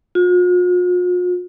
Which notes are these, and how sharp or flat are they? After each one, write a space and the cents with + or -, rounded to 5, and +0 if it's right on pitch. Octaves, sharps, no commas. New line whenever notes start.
F4 +45